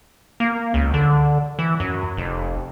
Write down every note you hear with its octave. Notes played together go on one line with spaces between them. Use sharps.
A#3
C#2
D3
E3
F#2
F1